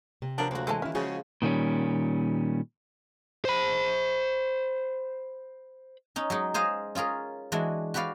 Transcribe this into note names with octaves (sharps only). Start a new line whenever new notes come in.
C3
F3 F#3 B3 D4 A#4
D2 A#3 F#4
E3 G#3 A3 C5 A5
D#3 C#4 E4
C#3 F3 F#4 G#4
A#2 D#3 G3 C#4
C5 B5
C#4 D#4
F#3 G#3 D#4
G#4 C5 D#5 F5 G#5
C#4 F4 G#4 A#4
E3 G#3 D4 F#4
F#4 G4 B4 D5 F5